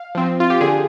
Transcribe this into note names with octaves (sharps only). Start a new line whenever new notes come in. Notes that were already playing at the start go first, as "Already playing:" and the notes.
Already playing: F5
F3 C4
F4
G4
D3 G#4